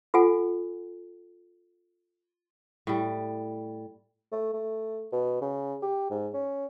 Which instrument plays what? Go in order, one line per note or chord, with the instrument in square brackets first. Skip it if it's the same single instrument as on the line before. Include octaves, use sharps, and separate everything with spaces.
[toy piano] F4 A4 F#5 G#5
[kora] A2 G3
[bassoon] A3
A3
B2
C#3
G4
G#2
C#4